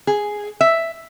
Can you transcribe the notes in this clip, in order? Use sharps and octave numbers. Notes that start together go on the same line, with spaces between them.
G#4
E5